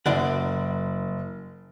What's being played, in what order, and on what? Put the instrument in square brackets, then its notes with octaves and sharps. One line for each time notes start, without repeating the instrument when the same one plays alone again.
[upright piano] F#1 [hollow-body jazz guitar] F#2 D5 F#5